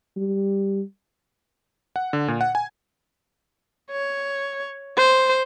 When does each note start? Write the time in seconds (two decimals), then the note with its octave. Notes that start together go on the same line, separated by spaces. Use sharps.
0.16 G3
1.96 F#5
2.13 D3
2.28 A#2
2.41 F#5
2.55 G#5
3.92 C#5
4.97 C5